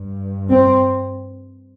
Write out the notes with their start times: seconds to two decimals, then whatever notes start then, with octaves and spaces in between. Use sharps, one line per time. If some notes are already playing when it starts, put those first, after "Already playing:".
Already playing: G2
0.50 C4